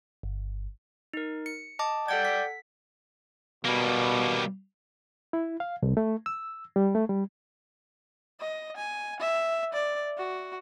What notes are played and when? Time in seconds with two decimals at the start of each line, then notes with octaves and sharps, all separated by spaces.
0.23 G1
1.13 D#4 A#4
1.46 C#7
1.79 D#5 A5 D6
2.08 A4 D5 F#5 G5 G#6
2.25 B6
3.65 B2 G3 A#3
5.33 E4
5.60 F5
5.82 C2
5.97 A3
6.26 E6
6.76 G3
6.95 A3
7.09 G3
8.40 D#5
8.77 G#5
9.20 E5
9.73 D5
10.18 F#4